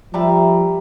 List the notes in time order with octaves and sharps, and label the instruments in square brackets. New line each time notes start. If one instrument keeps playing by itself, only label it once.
[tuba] F3 [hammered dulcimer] G3 A#5 B5 [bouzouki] A3 E5 F5